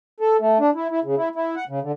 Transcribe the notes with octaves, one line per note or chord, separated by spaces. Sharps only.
A4
A3
D4
E4
E4
C#3
E4
E4
F#5
C#3
D3